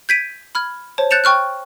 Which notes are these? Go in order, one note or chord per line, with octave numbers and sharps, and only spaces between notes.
G6 G#6 B6 D7 D#7
B5 F6 G#6
C5 C#5 A5
F#6 G6 A6 C#7 E7 F7
G5 C#6 F6 F#6